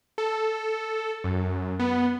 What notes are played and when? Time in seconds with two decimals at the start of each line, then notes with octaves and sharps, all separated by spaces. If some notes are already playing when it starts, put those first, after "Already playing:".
0.18 A4
1.24 F#2
1.79 B3